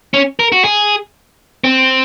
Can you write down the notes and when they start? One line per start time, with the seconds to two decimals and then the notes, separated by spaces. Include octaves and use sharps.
0.14 C#4
0.39 A#4
0.52 F#4
0.64 G#4
1.64 C4